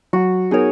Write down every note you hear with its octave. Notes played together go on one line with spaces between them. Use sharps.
F#3 F#4
B3 D#4 G#4 A#4 C#5